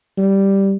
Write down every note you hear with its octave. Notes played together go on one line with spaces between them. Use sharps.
G3